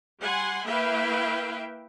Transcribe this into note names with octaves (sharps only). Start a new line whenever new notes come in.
G3 F#5 G#5 C6
A#3 E4 B4 E5 F5 G5